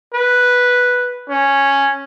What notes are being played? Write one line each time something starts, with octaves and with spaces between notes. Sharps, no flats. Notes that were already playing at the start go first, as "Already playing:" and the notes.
B4
C#4